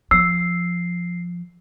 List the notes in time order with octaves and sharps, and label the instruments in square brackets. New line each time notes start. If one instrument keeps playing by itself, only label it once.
[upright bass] F3 [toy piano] E6 [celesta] C7